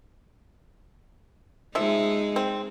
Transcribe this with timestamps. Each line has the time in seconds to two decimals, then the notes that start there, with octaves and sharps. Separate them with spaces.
1.75 F3 G#3 D#4 E5
2.36 C4